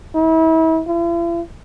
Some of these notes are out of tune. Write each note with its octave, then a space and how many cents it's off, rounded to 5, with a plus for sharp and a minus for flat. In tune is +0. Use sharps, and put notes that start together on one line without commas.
E4 -35
E4 +45